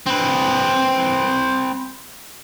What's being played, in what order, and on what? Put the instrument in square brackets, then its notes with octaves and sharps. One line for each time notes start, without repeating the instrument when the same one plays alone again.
[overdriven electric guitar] C4 B4